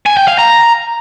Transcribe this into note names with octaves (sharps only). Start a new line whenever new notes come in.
G#5
G5
F5
A#5